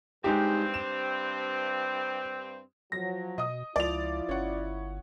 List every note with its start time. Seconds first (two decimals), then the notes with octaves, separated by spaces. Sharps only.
0.24 G2 G#3 C4 D#4 G4
0.74 E7
2.92 F3 F#3 A#6
3.38 B2 D#5 D#6
3.76 C#2 F3 E4 F4 D5 F7
4.29 G1 C#4 F#5